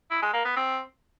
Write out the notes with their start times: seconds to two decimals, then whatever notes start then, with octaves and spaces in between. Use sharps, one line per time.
0.11 E4
0.22 G#3
0.33 A#3
0.45 B3
0.56 C4